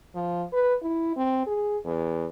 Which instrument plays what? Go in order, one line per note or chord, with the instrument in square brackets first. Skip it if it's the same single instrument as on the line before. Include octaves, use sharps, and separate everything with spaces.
[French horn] F3
B4
E4
C4
G#4
E2